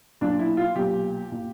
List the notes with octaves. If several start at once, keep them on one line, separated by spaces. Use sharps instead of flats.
B1 A#2 D4
E4
F4
B1 A#2 G4
A#2